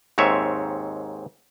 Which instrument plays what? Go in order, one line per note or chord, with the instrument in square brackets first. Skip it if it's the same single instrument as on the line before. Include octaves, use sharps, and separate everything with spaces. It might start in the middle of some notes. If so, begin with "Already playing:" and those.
[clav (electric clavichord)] D#2 G#2 C4 C#5 E5